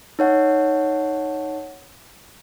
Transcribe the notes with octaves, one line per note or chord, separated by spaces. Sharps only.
D#4 C#5 F#5